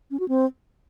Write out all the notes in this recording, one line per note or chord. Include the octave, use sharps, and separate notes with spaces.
C#4
F#4
C4